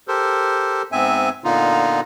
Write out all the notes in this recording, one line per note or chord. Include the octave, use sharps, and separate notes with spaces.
G4 A4 A#4 C5
G#2 B3 C4 E5 G#5
A#2 D3 B3 D#4 F4